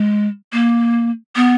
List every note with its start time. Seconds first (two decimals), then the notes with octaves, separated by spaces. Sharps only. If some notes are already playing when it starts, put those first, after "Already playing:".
Already playing: G#3
0.53 A#3
1.36 B3